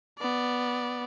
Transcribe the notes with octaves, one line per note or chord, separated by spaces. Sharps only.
B3 D5